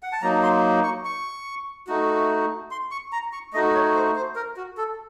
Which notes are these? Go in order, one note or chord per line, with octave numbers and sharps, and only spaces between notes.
F#5
A5
F#3 A#3 D#4 A#5
C6
C#6
C#6
A3 D#4 F#4
C6
C#6
A#5
C#6
A3 D#4 F#4 D#5
C#5
C5
C5
A#4
F#4
A4